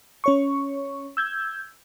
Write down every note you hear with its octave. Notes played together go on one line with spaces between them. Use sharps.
C#4 C#5 C#6
E6 G6 G#6